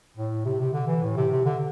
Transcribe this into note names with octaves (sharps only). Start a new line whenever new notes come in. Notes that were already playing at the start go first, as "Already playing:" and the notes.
A2
C3
C3
D3
E3
A2
C3
C3
D3